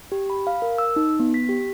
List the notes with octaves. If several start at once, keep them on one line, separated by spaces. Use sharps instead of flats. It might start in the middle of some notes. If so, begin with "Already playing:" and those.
G4
B5
F5
A#4
E6
D#4
B3
B6
G4